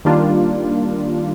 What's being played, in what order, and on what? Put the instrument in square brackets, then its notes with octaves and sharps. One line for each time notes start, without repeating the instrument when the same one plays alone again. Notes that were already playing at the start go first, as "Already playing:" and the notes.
[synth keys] D#3 G3 A#3 D4 F4